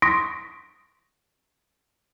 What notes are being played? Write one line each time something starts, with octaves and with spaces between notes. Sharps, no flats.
C6 C#6 D#6 A#6 B6 D7